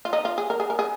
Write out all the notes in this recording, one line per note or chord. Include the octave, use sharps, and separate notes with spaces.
F4
D#4
F4
G#4
A#4
G#4
A#4
G#4